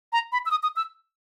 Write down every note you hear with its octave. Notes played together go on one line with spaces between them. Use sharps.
A#5
B5
E6
D#6
D#6
E6